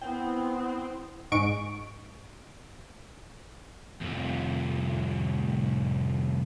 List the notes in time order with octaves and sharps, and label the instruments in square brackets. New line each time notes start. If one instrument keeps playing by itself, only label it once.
[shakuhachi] B3 [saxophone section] C4 [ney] E4 [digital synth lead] G5
[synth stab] G#2 G#3 C#6 D7
[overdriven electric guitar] C2 F2